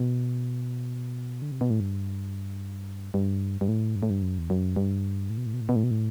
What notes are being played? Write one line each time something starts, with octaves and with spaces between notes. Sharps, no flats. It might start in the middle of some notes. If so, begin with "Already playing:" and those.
Already playing: B2
D3
C3
B2
A2
G2
G2
G2
A2
G2
A2
G2
F#2
E2
F#2
G2
A2
B2
A2
B2
A2
B2
A2
B2
A2